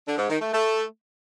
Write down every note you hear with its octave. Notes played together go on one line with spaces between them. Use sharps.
D3
G#2
D#3
A3
A3